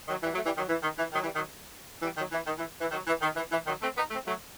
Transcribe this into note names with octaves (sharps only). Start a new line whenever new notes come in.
D#3 F#3
E3 G3
F#3 A3
E3 G3
D#3 F#3
E3
D#3
E3
D#3 F#3
E3 G3
D#3 F#3
E3 G3
D#3 F#3
E3
D#3
E3
E3
D#3 F#3
E3
D#3
E3
E3
D#3 F#3
A3 C4
B3 D#4
A3 C4
F#3 A3